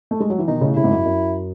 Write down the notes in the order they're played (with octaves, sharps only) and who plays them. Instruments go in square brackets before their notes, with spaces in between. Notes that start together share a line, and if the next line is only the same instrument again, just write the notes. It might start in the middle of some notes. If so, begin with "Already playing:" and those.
[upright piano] A3
G#3
F#3
E3
[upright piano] B2 D#3 [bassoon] D#4
[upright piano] A2 C#3
[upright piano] A2 C#3 [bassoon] E4
[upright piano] G#2
F#2
F#2